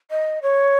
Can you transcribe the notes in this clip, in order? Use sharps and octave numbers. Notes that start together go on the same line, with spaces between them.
D#5
C#5